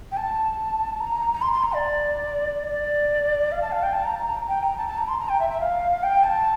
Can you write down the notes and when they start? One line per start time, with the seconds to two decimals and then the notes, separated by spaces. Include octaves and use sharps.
0.12 G5
0.17 A5
1.00 A#5
1.33 A#5
1.42 C6
1.53 C6
1.63 A#5
1.73 D5
2.68 D5
3.52 F5
3.62 A5
3.72 F5
3.83 G5
3.93 A5
4.04 A#5
4.15 A5
4.24 A#5
4.49 G5
4.63 A#5
4.77 A5
4.88 A5
4.97 A#5
5.08 C6
5.19 A#5
5.29 G5
5.40 E5
5.50 E5
5.61 F5
6.03 G5
6.24 A5